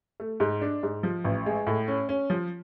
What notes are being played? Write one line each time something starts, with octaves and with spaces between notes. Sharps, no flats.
A3
G#2
D4
G#2
F3
A1
G#3
A2
C#4
C#4
F3